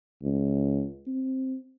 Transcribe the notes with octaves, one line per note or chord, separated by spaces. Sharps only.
C#2
C4